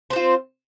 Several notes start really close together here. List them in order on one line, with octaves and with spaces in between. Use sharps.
C5 C4 F4